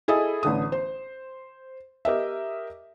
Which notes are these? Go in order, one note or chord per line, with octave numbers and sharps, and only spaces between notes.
E4 G#4 A4 D#5 E5 D#6
A1 D3 D#6
C5
G4 A#4 D#5 E5